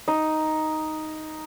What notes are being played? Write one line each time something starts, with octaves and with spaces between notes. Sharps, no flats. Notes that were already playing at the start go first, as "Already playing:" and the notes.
D#4